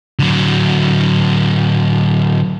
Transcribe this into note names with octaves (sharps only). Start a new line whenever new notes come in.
D3 F#3